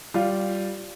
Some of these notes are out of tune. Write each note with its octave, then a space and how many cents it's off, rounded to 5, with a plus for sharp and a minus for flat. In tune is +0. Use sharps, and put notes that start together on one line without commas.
G3 -10 F4 +0 F5 -10